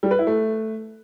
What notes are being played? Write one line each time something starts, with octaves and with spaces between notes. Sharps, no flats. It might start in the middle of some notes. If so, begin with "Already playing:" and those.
G3
B4
E4
A3